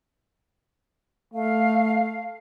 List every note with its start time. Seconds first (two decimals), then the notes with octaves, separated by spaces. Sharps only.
1.34 A3 F5